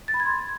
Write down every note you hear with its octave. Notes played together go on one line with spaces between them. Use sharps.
A6
B5
G#6
C6